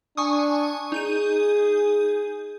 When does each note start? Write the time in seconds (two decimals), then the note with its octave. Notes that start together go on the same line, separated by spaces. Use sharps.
0.17 D4 G#5 C#6 D#6
0.92 D#4 G#4 G6 D#7